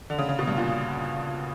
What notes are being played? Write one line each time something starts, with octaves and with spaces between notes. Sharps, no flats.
D3
C#3
C#3
B2
G2
A#2